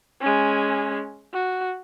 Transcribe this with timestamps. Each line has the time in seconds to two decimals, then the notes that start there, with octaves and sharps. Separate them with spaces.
0.21 G#3 C#4
1.33 F#4